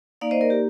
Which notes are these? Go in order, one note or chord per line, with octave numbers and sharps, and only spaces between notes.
A#3 D#4 D5 F5
C5 D#5
A#4 D5
G4